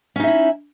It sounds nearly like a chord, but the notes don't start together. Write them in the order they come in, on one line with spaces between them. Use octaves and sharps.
C#4 D#4 E5 E4